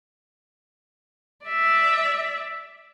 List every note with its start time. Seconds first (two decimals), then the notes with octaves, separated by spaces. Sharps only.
1.46 D5 E5